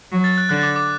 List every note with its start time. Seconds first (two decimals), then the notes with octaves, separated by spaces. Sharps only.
0.12 F#3
0.24 A6
0.38 F#6
0.49 D3 F#6
0.63 D6
0.76 D6